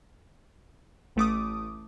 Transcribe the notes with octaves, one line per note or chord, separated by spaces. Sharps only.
A1 A3 D6 D#6